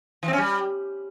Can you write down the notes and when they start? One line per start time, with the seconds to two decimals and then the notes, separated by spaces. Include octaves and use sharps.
0.23 E3
0.28 C4
0.33 C#4
0.38 G3